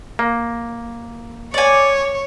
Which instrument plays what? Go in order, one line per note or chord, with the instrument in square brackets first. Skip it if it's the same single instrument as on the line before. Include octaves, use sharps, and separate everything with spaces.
[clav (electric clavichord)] A#3
[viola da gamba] C#5 [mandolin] D5 G#5